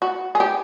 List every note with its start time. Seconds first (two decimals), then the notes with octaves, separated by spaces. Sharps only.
0.02 F#4
0.35 G#4
0.40 G4